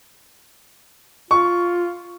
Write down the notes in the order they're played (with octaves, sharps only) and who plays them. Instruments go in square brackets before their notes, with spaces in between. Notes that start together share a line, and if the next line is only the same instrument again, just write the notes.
[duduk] F4 [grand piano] C#6